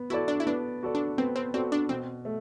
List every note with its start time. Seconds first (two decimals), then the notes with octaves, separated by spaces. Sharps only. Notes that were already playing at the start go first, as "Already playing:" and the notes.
Already playing: B3
0.10 E4 F#4 A4 D5
0.28 D4
0.40 E4
0.46 B3 D4
0.83 F#4 A4 D5
0.95 D4
1.18 B3 C4
1.36 C4
1.54 C4 F#4 A4 D5
1.72 D4
1.89 B2 C4
2.25 A3